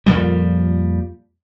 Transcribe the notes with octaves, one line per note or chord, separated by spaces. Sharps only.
F2 A#2 F3 G3